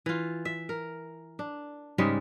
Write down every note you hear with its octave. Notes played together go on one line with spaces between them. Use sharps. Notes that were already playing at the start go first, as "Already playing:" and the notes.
E3 F4
E5
A#4
D4
G#2 C#3 G3 G#3